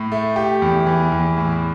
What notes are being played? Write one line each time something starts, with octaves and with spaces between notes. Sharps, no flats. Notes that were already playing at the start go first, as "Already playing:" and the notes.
Already playing: A2
A3
G4
E2
E3
E2
A2